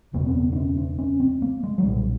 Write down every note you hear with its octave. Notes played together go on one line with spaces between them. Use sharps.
F#1 E2 B2 A#3
C4
B3
D4
C#4
D4
C#4
C4
A#3
G#3
F#3
B1 A#2 G3